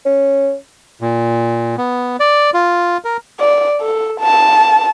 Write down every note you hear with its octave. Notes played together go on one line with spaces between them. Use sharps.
C#4
A#2
B3
D5
F4
A#4
D5
A4
A5